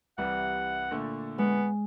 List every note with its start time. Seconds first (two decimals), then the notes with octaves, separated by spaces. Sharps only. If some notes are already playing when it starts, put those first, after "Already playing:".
0.18 C2 E3 G3 F#5
0.91 A#2 D3 A3
1.38 G#3 B3